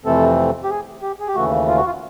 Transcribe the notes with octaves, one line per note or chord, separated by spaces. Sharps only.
F2 C3 E3 A3 C4 A4
G4
G#4
G4
G#4
G4
D#2 C#3 E3 A3 F#4
F4
F#4
F4